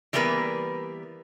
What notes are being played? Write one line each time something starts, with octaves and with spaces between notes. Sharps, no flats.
E3 G3 A#3 B3 A#4 B4